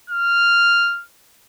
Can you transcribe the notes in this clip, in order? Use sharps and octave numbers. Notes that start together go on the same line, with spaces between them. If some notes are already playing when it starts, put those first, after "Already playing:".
F6